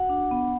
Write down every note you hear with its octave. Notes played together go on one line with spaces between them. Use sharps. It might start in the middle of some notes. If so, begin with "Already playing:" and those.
Already playing: F#4 F#5
D4
B3